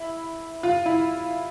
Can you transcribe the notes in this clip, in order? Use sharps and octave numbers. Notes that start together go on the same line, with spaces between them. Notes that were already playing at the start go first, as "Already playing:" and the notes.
Already playing: E4
F4
E4